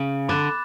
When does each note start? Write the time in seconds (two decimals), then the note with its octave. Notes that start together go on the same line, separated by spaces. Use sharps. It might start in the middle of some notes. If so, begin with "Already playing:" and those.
Already playing: C#3
0.28 D3 B5 D6 F#6 A6 E7